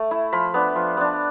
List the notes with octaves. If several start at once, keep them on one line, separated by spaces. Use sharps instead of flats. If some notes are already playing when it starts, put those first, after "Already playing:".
Already playing: A3
E4
F3 B5
B3 D4
F3
B3 D4